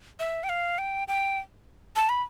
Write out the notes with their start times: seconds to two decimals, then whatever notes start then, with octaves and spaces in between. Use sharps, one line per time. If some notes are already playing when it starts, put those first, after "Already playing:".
0.19 E5
0.44 G5
0.49 F5
0.78 G5
1.08 G5
1.96 A5
2.09 B5